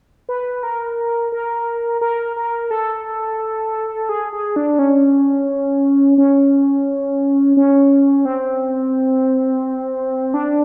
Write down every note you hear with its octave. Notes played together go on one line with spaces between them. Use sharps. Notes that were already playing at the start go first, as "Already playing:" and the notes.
B4
A#4
A#4
A#4
A#4
A4
G#4
G#4
D4
C#4
C#4
C#4
C4
D4